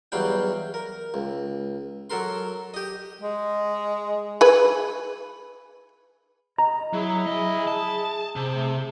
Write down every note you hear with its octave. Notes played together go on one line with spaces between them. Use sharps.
E2 F#3 G3 F5 G5
A#4
C#2
F#3 A4 A#4 C6
G4 D#5
G#3
G#4 B4
D#5 A#5
F#3 E4 G#4
F#3 D#5
A5
C3
A3